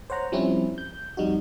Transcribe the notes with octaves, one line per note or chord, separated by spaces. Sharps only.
C5 C#5 F#5 A#5
F3 G3 C4 C#4 E4
G6
F2 G3 D#4 F#4